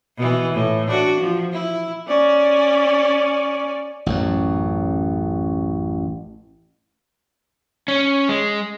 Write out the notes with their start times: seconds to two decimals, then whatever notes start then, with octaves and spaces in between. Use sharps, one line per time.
0.17 B2 E3
0.53 A2
0.87 D4 F#4
1.20 F3
1.52 E4
2.08 C#4 D5
4.06 A1 F#2
7.88 C#4
8.29 G#3